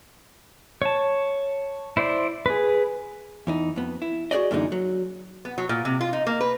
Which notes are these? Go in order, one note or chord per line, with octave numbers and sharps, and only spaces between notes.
C#5 A5
E4 C5 D5
G#4 B4
E2 E3 D#4
F2 B3
E4
F#4 G#4 C5 D5 D#5
F#2 A#2 D3 E3 G#3 D#4
F#3
B3
F#3
A#2
C3
F4
D#4
A#3
B4